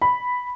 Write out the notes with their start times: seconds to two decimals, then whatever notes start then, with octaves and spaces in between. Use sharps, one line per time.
0.02 B5